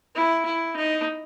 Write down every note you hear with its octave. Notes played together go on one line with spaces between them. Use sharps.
E4
E4
D#4